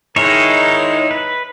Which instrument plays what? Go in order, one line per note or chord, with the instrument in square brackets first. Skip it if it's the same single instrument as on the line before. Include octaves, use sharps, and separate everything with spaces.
[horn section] D#3 G#3 A#4 [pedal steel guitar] D#4 E4 C#5
[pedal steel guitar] B4